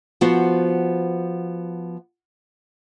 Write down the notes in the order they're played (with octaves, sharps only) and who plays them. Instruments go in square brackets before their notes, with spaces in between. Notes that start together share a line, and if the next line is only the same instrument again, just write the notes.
[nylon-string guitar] F3 B3 F#4 C5